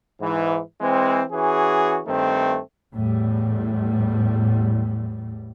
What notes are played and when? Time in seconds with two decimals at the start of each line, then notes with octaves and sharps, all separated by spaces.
0.20 G#2 E3
0.81 E3 G#3 C4
1.31 E3 C#4 F#4 G#4
2.06 G2 D#3 A3 C4
2.94 E2 A2 G3